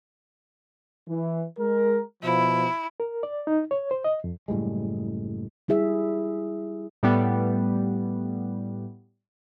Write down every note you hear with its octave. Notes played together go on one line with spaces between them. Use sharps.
E3
G#3 A#4
B2 F3 E4
A#4
D5
D#4
C#5
C5
D#5
F2
F#1 A2 G3 G#3
G3 E4 G#4 E5
A2 G3 B3